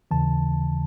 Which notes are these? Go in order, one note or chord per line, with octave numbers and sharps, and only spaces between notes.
D#2 C#3 E3 A5